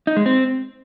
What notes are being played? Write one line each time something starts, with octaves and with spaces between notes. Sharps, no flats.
D#4
G#3
C4